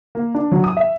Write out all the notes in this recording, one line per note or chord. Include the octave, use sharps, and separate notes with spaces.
A#3
D4
F#3
D#6
E5